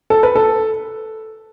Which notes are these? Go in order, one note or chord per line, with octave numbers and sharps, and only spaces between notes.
A4
B4
A4